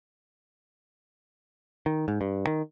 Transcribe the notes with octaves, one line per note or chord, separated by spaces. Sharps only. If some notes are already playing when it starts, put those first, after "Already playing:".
D#3
G#2
G2
D#3